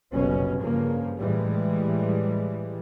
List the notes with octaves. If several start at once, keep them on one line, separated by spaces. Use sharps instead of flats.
F#1 C2 B2 C#4
G2 C#3 F3 A#3
A2 E3 G3 G#3